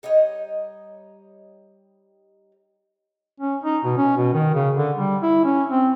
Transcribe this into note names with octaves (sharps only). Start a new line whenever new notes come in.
G3 D#4 C#5 D#5
C#4
D#4
B2
C#4
B2
D#3
C#3
D3
G3
E4
C#4
C4